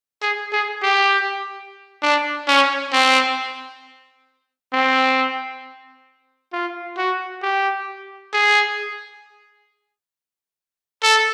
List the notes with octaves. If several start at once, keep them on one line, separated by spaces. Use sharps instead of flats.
G#4
G#4
G4
D4
C#4
C4
C4
F4
F#4
G4
G#4
A4